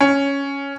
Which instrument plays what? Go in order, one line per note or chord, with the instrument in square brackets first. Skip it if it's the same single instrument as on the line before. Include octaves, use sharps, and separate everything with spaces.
[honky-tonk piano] C#4